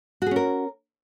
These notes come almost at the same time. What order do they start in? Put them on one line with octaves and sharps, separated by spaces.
F#4 G#4 C#4 A#4